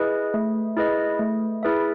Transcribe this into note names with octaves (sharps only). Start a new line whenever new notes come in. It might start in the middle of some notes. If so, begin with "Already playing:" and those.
Already playing: E4 G#4 B4 D#5
A3
E4 G#4 B4 D#5
A3
E4 G#4 B4 E5